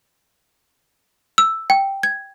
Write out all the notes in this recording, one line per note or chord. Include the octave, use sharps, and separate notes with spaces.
E6
G5
G#6